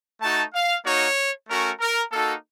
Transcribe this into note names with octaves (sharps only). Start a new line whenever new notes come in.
A3 D#4 F#4 A5
F5
A#3 D#4 F#4 C#5
A3 C#4 F#4 A#4
A#4
A#3 D#4 F#4 A4